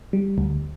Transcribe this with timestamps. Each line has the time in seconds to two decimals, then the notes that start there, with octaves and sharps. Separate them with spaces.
0.13 G3
0.38 D2